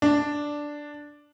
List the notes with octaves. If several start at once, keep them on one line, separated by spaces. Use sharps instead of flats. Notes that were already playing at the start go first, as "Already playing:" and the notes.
D4